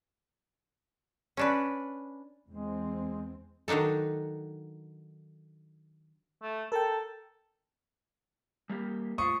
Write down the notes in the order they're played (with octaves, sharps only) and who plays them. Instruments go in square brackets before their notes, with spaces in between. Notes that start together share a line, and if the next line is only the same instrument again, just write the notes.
[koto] C#4 D4 B4
[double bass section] E2 C4 [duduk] G#3
[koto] D#3 F#3 D4 D#4 A4
[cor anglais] A3
[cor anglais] A4 [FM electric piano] A#4 G5
[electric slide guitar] G3 A#3 G4
[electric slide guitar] A2 F4 C5 [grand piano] C#6 D#6